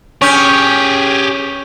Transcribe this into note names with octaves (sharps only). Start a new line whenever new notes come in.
C#4 G4 G#4 C#6 G6